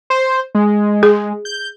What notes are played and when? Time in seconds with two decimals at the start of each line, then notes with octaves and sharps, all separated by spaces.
0.10 C5
0.55 G#3
1.03 G#4
1.45 G6